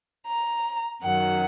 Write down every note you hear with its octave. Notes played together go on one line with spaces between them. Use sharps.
A#5
F#2 D#3 F#3 F#5